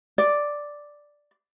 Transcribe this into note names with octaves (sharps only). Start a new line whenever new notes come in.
D5